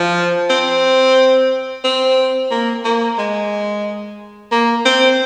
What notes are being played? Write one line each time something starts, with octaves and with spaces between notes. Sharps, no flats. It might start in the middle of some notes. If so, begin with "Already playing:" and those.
Already playing: F3
C4
C4
A#3
A#3
G#3
A#3
C4